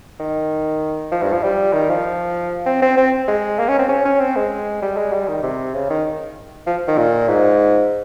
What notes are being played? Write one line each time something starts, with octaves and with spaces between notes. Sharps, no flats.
D#3
F3
G2
F3
G3
D#3
F3
C4
C4
C4
G#3
A#3
C#4
C4
C#4
C#4
C4
G#3
G3
G#3
G3
D#3
C3
C#3
D#3
F3
D#3
A#2
G#2